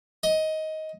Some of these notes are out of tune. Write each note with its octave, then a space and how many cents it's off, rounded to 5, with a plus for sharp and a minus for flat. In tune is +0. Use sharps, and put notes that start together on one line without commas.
D#5 +15